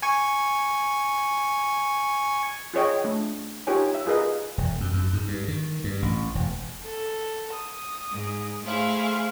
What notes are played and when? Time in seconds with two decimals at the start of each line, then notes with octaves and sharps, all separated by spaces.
0.02 G#5 C#6
2.74 F4 G#4 C#5 D#5 G5
3.04 A3 D4
3.67 D#4 F4 G4 A#4 C#5 G#5
3.95 E5
4.06 F4 G#4 A#4 B4 D#5
4.58 E1
4.80 F#2
4.94 F#2
5.13 G#2
5.28 G2
5.48 D#3
5.84 G2
6.02 A1
6.35 E1
6.83 A4
7.54 D#6
8.11 G#2
8.64 A3 E4 G#4 C5 F5